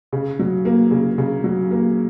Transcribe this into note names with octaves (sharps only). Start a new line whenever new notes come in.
C#3
F#3
A#3
C#3
C#3
F#3
A#3